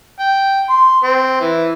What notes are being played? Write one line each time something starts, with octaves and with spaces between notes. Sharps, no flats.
G5
C6
C4
E3